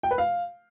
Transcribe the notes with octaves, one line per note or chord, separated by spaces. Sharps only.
G5
B4
F5